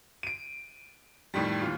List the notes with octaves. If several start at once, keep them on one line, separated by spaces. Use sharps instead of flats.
D7 D#7
F2 A2 D#3 G3
D#2 E3 F4